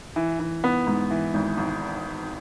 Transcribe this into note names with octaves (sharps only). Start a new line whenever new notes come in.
E3
E3
B3
G#2
E3
G#1
G#1